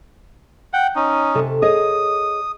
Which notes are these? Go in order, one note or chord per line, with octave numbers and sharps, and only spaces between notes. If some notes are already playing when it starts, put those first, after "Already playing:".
F#5 G5
C#4 D#4
C3 A4
G#4 C#5 D#5 D#6